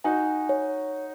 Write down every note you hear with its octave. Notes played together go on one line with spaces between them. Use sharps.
D#4 F#4 G#5
C#5